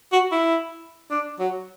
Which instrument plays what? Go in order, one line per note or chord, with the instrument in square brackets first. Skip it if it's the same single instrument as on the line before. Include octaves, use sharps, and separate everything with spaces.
[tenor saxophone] F#4
E4
D4
F#3